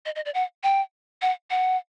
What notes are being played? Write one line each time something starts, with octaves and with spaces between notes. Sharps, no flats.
D#5
D#5
D5
F#5
G5
F#5
F#5